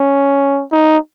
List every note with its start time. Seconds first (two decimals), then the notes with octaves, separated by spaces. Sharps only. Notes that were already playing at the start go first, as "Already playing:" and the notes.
Already playing: C#4
0.72 D#4